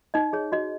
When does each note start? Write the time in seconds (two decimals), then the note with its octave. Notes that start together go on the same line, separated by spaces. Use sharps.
0.14 D#4 D#5
0.33 G#4 C#5
0.52 F#4 D#5